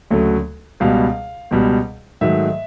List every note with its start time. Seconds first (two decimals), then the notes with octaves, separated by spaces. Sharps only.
0.11 D2 C#3 F#3 A3
0.80 C#2 B2 G3 F5
1.51 C#2 B2 G3
2.21 G#2 D#3 F#3 A3 E5